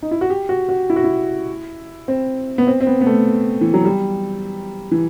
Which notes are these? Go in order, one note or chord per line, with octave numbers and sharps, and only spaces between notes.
D#4
E4
F#4
G4
F#4
F#4
E4
F#4
E4
C4
B3
C4
C4
B3
B3
A3
E3
F#3
G3
E3